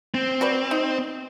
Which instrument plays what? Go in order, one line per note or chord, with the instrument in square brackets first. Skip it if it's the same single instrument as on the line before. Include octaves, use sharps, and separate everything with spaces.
[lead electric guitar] C4
[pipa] F#4 B4 D5
D#4